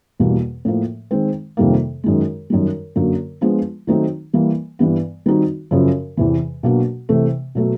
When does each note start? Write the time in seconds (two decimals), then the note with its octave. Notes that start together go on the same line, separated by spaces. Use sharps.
0.20 E2 B2 G3 A#3
0.65 A2 F3 A#3
1.11 D#3 G#3 C4
1.57 F2 C3 D#3 G3 A#3
2.04 F#2 D#3 G#3
2.50 F#2 D#3 G3
2.96 F#2 D3 F#3 A#3
3.41 F3 G#3 B3 D4 F4
3.87 D#3 F#3 A3 C4 D#4
4.33 E3 G3 A#3
4.79 G2 E3 G3 B3
5.26 D#3 G3 C4 D#4 F#4
5.71 F#2 C#3 F3
6.17 E2 C3 E3
6.63 B2 F#3 A#3 D4 F#4
7.09 C3 E3 A3
7.55 B2 F#3 A3